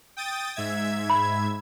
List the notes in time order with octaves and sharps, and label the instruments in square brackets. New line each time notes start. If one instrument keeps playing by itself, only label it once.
[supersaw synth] G5 D#6 A6
G#2 E5 G#6
[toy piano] B5